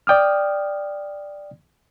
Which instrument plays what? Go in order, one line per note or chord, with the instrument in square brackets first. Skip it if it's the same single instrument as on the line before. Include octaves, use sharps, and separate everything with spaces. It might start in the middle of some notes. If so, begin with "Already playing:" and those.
[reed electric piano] D5 G5 D#6 F6